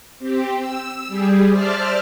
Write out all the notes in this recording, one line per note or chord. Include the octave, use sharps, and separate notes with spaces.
C4 G4
E6
G3 G4 G#4
C5 D5 E5 A5 F6